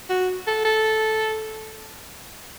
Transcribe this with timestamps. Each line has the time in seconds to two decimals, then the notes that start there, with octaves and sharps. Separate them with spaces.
0.10 F#4
0.47 A4
0.65 A4